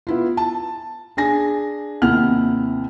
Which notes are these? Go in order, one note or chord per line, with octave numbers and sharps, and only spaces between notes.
B3 E4 F4
A5
D4 G#4 G#5 A#6
D#2 C3 E4 F#5 F6